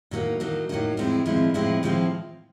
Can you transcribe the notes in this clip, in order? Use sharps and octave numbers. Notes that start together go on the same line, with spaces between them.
A2 F#3 A#3 D#4
A2 F#3 A#3 D#4
A2 F#3 A#3 D#4
A2 F3 G#3 C4 E4
A2 F3 G#3 C4 E4
A2 F3 G#3 C4 E4
A2 F3 G#3 C4 E4